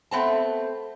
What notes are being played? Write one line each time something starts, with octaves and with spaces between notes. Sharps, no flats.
A3 B3 C4 A5